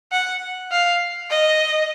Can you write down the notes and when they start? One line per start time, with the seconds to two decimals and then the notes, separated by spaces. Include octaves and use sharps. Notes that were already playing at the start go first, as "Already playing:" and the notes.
0.12 F#5
0.72 F5
1.30 D#5